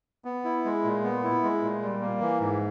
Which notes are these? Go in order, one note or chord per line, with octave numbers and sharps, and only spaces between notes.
B3
E4
G#3
A#2
B3
E4
G#3
A#2
G3
A#3
E3
G#2